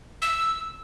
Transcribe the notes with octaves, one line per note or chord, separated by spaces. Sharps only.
E6